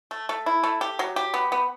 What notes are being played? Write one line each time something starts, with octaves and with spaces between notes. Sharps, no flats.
A3
A3
E4
A3
G4
F#3
G4
B3
B3